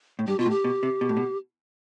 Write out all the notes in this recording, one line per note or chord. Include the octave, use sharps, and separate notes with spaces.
A2
G2 G4
B2 F4
A2
G4
B2
C3
B2
A2
B2